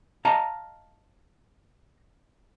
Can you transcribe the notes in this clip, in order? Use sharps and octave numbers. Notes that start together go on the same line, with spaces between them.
D#5 F5 A5 A#5